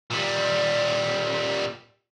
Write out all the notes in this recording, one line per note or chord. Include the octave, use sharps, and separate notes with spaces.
A#2 G3